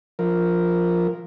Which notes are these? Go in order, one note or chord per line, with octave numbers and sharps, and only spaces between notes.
F3 A#4